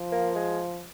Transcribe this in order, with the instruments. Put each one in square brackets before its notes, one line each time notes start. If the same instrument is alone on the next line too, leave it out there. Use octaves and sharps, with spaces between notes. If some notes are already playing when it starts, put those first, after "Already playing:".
Already playing: [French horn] F3
[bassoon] A#3
G#3